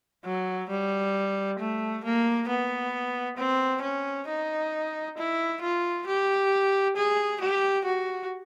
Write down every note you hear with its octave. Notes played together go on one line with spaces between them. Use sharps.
F#3
G3
A3
A#3
B3
C4
C#4
D#4
E4
F4
G4
G#4
G4
F#4